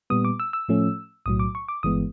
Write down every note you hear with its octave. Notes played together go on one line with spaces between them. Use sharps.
A#2 G3 B3 D#6
D6
E6
E6
A2 F3 A3 C#4
B1 A2 F#3 D#6
D6
C#6
D6
G1 G2 E3 G#3 B3 D#6